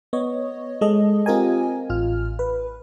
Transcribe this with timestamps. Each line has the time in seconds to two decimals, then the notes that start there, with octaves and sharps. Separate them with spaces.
0.13 B3 C#5 D#5
0.81 G#3 A4 D#5
1.26 C4 F4 G4 A#4 D#5 G#5
1.89 A1 F4 F6
2.39 B4